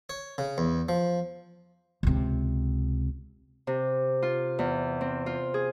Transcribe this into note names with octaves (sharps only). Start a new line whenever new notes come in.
C#5
C#3
E2
F3
C#2 C3
C3
F4
E2
C4
F4
G#4